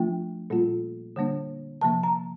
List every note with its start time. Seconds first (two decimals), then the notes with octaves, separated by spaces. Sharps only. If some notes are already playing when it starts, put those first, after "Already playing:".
Already playing: F3 A3 D4 F4 G5
0.50 A#2 G3 A#3 F4
1.16 D3 G3 A#3 D4
1.81 C3 F3 A#3 A5
2.03 A#5